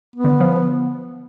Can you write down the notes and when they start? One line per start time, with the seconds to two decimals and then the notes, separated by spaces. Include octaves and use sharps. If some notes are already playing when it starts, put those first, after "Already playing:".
0.16 B3
0.24 D3
0.40 F3